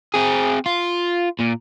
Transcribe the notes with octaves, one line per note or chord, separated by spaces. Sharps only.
C4 G#4
F4
A#2